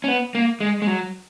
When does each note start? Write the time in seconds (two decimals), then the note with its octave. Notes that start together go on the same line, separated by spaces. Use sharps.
0.04 C#4
0.08 B3
0.35 A#3
0.61 G#3
0.82 G#3
0.87 F#3